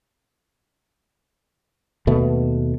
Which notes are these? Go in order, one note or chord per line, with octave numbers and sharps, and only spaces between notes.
D#2 B2 A3 B3